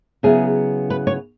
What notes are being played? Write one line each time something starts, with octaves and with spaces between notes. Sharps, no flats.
C#3 F#3 B3 E4 G#4
B4
C#5